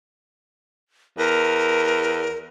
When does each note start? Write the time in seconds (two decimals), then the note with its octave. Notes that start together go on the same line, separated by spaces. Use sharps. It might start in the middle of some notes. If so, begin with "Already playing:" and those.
1.18 E2 A#4